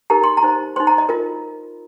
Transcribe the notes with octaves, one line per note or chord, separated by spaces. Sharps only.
D#4 G4 A#4 A#5
C6
A#5
D#4 C5
D#4 C5 C6
A#5
D#5
F4 A#4